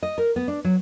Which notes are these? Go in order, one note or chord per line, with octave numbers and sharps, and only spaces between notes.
D#5
A#4
B3
D4
F#3